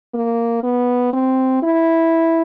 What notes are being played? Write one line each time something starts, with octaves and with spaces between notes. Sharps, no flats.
A#3
B3
C4
E4